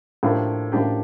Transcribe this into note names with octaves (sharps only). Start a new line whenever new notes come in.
A2 F3 A#3 D4 G4
A2 F3 A#3 D4 G4